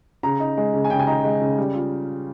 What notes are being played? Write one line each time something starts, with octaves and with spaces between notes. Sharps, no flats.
C#3 A#5
D#4
G#3
C#3
G#5
C#3 G5
G#5
D#4 A#5
G#3
C#3
G3
F4